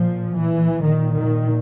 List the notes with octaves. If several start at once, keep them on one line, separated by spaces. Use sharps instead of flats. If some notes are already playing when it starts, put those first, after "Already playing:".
Already playing: A#2 F3
E3
A#2 D#3
D#3